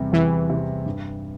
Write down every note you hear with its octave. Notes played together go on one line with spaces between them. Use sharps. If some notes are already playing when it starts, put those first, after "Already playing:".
Already playing: E2 C3 G3 C4
E2 E3
C3 G3 C4
G2